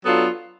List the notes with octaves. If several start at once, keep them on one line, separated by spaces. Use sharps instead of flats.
F#3 B3 D4 F4 A4